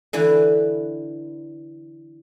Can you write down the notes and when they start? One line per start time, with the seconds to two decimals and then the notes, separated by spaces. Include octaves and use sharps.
0.13 D3 E3 B4